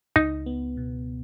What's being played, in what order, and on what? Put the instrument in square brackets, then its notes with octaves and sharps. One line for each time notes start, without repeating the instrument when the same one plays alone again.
[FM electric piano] C#2 [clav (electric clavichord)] D#4
[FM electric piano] B3
B2